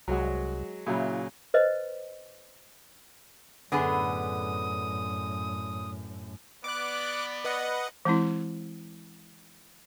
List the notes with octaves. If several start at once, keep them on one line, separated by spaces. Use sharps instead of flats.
C2 F#3 G#3 F#4
A#2 C#3 F#3 E4
B4 C5 D#5
F#2 A2 D3 B3 G#4 D#6
B3 D5 D6 F#6
B4 D#5 F#5
E3 G#3 C4 E4